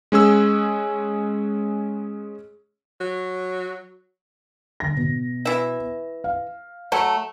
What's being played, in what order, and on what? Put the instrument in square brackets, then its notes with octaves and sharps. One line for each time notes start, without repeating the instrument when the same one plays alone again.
[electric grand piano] G#3 C#4 G#4 E6
[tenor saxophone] F#3
[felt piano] G1 A#6
B2
[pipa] E3 E5
[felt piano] F5
[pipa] F#3 A3